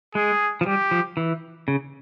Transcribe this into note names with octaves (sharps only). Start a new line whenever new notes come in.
G#3 G#4
F3
G3 G4
F3
E3
C#3